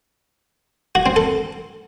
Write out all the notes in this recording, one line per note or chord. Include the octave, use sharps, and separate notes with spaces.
F#4
C4
A4